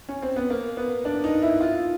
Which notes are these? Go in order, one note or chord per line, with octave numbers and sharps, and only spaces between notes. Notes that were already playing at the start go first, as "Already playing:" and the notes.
C#4
C4
B3
A#3
B3
D4
D#4
E4
F4